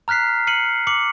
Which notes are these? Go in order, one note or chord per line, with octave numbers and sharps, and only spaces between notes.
A#5 F6 F#6 B6 C7
F6 C7 C#7 D#7 F#7
D6 C#7 F#7